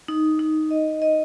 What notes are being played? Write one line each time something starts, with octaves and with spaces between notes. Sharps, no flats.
D#4
D#4
D#5
D#5